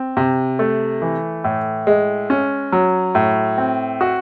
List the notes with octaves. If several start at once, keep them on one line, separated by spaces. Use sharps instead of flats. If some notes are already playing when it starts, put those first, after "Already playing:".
Already playing: C4
C3
A3
E3
A2
G#3
C#4
F#3
A2
C4
F#4